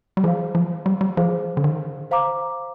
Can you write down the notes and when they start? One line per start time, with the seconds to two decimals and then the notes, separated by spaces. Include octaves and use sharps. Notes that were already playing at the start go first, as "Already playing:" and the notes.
0.17 G3
0.23 F3 G#4 C5 F5
0.55 F3
0.86 G3
1.01 G3
1.17 F3 G#4 C5 F5
1.57 D3
1.64 D#3
2.11 C5 F5 A#5 D6